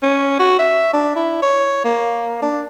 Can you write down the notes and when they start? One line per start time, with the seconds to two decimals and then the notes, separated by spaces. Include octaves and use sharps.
0.03 C#4
0.39 F#4
0.59 E5
0.93 D4
1.16 E4
1.42 C#5
1.84 A#3
2.42 D4